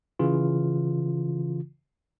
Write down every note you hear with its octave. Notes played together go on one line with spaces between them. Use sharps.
C#3 E3 F4